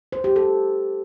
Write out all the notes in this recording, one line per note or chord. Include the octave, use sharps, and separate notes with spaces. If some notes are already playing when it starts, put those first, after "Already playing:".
C5
G4
A4